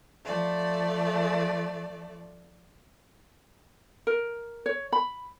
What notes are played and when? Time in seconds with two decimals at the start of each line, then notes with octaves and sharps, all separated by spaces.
0.24 F3 A3 D5
4.07 A#4
4.66 C#5
4.92 B5